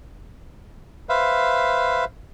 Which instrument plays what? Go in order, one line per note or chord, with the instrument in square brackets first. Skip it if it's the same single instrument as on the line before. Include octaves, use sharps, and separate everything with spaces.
[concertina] B4 C5 E5 F5